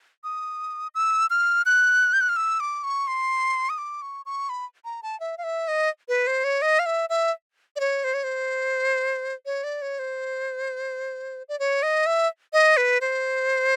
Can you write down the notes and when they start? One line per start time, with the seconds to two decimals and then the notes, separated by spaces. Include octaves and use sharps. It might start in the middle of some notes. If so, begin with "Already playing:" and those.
0.24 D#6
0.95 E6
1.30 F6
1.66 F#6
2.13 G6
2.21 F#6
2.29 F6
2.36 E6
2.60 D6
2.84 C#6
3.07 C6
3.69 D#6
3.78 D6
4.02 C#6
4.26 C#6
4.49 B5
4.85 A#5
5.03 A5
5.20 E5
5.38 F5
5.44 E5
5.68 D#5
6.09 B4
6.27 C5
6.44 C#5
6.62 D#5
6.79 F5
6.86 E5
7.09 E5
7.76 D5
7.80 C#5
8.04 C5
8.14 C#5
8.24 C5
9.46 C#5
9.64 D5
9.82 C#5
9.99 C5
11.49 D5
11.59 C#5
11.83 D#5
12.06 E5
12.53 D#5
12.77 B4
13.01 C5